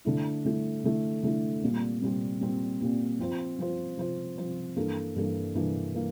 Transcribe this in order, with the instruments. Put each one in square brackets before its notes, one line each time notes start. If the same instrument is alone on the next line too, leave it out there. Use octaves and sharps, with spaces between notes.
[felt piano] D3 A3 E4
D3 A3 E4
D3 A3 E4
D3 A3 E4
A#2 G3 C4
A#2 G3 C4
A#2 G3 C4
A#2 G3 C4
F3 C4 F4 C5
F3 C4 F4 C5
F3 C4 F4 C5
F3 C4 F4 C5
G2 E3 A#3 D4 A4
G2 E3 A#3 D4 A4
G2 E3 A#3 D4 A4
E3 A#3